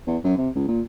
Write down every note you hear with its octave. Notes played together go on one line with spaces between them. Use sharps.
E2
F#2
C3
C#2
A#2